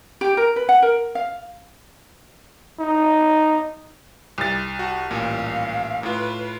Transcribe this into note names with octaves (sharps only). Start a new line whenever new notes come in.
G4
A#4
B4
F#5
A#4
F5
D#4
C2 A6
F#4 A5
A1 A#2 F5
A2 F4 B4